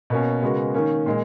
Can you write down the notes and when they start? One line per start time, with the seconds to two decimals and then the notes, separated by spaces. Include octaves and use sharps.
0.10 B2 A#3 C#4
0.43 C#3 G#3 B3 F#4 A#4
0.74 D#3 A#3 C#4
1.06 A#2 G#3